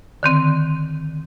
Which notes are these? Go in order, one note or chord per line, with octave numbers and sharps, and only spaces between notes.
D3 D#3 C4